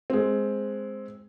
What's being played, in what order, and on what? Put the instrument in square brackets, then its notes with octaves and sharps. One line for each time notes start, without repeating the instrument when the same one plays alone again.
[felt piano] G#3 C4